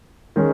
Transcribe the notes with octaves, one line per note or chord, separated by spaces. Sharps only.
D#3 G#3 C#4